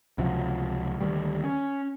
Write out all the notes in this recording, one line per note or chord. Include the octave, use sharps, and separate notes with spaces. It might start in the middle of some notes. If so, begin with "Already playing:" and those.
C#2 C3 F3 F#3
D2 D#3 G3
C#4